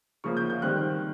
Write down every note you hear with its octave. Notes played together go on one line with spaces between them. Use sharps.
C#3 F3 A#3 C#6
G6
G6
D#3 G3 C4 F#6